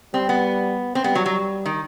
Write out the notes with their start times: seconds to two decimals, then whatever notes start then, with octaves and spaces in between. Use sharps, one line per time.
0.14 G3 C4
0.29 B3
0.95 C4
1.04 G3 B3
1.15 F#3
1.26 F#3
1.66 D#3